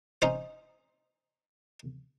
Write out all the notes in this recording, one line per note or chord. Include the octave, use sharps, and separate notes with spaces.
C#4 D#4 C5